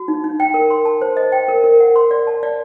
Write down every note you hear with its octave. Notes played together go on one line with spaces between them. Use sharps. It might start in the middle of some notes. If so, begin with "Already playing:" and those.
Already playing: F#4
D#4
D#4
G5
A#4
C6
A5
C5
D#5
G5
A#4
A#4
F#5
C6
D5
A5
D5